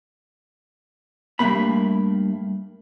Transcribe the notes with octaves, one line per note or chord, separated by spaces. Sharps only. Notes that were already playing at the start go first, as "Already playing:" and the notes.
G2 F3 A3 A#3 B5